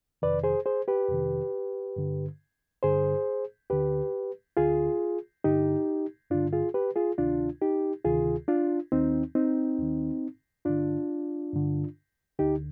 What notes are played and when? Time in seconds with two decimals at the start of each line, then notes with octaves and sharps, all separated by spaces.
0.22 F2 C3 D#3 B4 D5
0.44 G#4 C5
0.66 G#4 C5
0.88 G4 B4
1.09 F2 C3 D#3
1.96 G2 D3
2.83 G2 D3 G#4 C5
3.70 D2 D3 G4 B4
4.57 D2 D3 F4 G#4
5.44 G2 D3 D#4 G4
6.31 G2 D3 D4 F4
6.53 F4 G#4
6.74 G4 B4
6.96 F4 G#4
7.18 D2 C3 D#3 D4 F4
7.62 D#4 G4
8.04 D2 C3 D#3 F4 G#4
8.48 D4 F4
8.92 D#2 D#3 C4 D#4
9.35 C4 D#4
9.79 D#2 D#3
10.65 G2 D3 D4 F4
11.53 G2 D3
12.39 D2 D3 D#4 G4